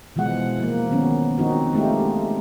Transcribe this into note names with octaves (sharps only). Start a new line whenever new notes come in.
B2 E3 F3 G#3 F#5
F3 A#3
D#3 F#3 B3 C#4
F3 C4 D#4 F#4
G#3 A3 D#4 F4 G4